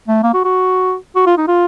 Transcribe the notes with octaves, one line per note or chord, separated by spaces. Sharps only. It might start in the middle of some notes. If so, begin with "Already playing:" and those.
A3
A#3
F#4
F#4
F#4
F4
D#4
F4